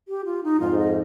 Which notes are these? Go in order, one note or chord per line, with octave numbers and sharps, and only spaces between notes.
G4
F4
D#4
F2 G#2 F4
D#5